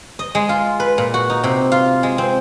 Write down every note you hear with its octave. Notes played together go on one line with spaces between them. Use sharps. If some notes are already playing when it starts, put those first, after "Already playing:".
D#5
G#3
F4
B4
A#2
F#4
D#4
C3
F4
G#3
C4